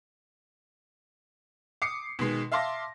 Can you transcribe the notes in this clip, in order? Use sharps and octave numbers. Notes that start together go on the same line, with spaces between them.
D6 D#6 C7 C#7
B2 D#3 G#3
E5 F5 A5 C6 D6 A#6